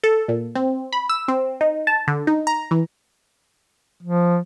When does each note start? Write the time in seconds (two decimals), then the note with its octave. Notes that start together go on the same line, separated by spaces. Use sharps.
0.04 A4
0.28 A#2
0.55 C4
0.93 B5
1.09 E6
1.28 C4
1.61 D#4
1.87 A5
2.08 D3
2.27 D#4
2.47 A#5
2.71 E3
4.03 F3